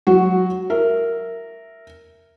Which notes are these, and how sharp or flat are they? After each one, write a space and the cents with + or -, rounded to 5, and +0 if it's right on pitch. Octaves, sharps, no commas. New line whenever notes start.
F#3 -15 F#4 +0
A#4 -10 E5 +0